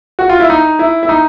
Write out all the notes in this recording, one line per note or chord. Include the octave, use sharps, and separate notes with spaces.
F#4
F4
E4
D#4
E4
E4
D#4